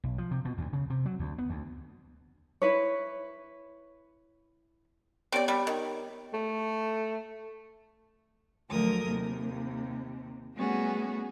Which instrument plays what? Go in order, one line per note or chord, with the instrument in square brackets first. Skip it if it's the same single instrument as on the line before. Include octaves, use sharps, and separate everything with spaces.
[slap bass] B1
F3
C3
B2
D2
C#3
C3
F#3
D2
B3
D2
[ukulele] E4 B4 C#5
[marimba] B3 G4 C#5 [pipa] C4 D5
[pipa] G3 [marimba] G4
[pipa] D#3
[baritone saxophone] A3
[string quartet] D2 F3 F#3 A4 A#4 D#6
D#2 C3
G3 A3 B3 C#4 F#4 G#4